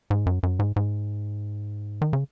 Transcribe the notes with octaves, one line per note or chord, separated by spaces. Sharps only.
G#2
F#2
F#2
G#2
G#2
D#3
C#3